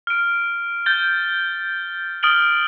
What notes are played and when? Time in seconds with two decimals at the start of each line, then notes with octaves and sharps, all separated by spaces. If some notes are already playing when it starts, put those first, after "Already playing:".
0.07 F6 D7
0.86 G6 A6 G7
2.23 D#6 F6 A6 D7 F#7 G7